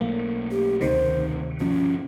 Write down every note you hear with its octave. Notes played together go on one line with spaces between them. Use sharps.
B1 A3 A#3
G4
D2 C3 D#3 C5
G1 B2 F3 C#4